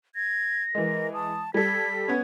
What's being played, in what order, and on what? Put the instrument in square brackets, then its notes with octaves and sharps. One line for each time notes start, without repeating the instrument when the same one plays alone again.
[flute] G#6 [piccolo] A#6
[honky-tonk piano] E3 G#3 [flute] A#4
[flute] A5 [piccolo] D#6
[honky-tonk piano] G3 A4 [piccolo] G#6 [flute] B6
[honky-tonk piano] B3 C#4 [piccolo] G#6